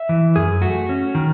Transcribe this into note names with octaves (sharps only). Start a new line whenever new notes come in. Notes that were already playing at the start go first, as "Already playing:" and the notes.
Already playing: E5
E3
F#2 G#4
A3 F#4
C#4
D#3